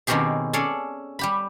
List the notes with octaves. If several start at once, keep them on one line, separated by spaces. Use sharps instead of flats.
B2 D#3 C4 C#4 G4 G#4
C#4 G#4 A4 C#5 D5
G3 G4 B5